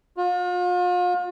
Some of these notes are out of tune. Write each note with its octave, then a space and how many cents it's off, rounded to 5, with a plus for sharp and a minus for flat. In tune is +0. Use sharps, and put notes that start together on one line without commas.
F4 +40